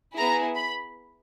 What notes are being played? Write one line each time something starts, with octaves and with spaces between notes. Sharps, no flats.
B3 E4 G#4 A#5
B5